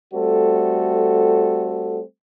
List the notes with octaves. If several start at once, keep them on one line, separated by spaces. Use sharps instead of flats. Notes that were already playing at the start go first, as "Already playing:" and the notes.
G3 A3 C4 F#4 A4